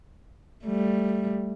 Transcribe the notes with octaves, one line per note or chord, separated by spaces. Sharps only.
G3 A3